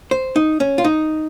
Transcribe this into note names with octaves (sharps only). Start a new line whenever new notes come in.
C5
D#4
C#4
F4
D#4